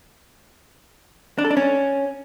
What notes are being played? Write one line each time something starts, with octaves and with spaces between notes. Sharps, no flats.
D4
A4
D4
C#4